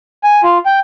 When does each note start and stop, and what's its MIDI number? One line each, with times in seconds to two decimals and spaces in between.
0.24 0.41 80
0.43 0.58 65
0.66 0.79 79